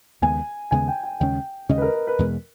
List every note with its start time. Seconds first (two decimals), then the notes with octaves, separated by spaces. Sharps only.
0.22 D#2 C#3 G#3 B3 G#5
0.71 D#2 C#3 G#3 B3 G#5
0.88 G5
1.03 G5
1.20 D#2 C#3 G#3 C#4 G5
1.69 D#2 C#3 G#3 C#4 D#5
1.78 B4
1.82 A#4
1.94 B4
2.07 B4
2.19 E2 B2 G#3